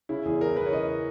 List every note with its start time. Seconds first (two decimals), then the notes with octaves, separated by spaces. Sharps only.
0.09 C#3 E4
0.25 E2 G#4
0.41 E3 A#4
0.56 E2 B4
0.66 C#5
0.72 C#3 D#5